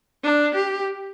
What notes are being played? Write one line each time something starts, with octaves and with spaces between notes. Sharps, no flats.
D4
G4